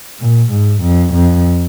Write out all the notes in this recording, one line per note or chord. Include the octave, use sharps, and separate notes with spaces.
A#2
G#2
F2
F2